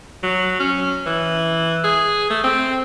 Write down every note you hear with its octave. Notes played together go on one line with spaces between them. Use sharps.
F#3
C#4
E3
G#4
A3
C4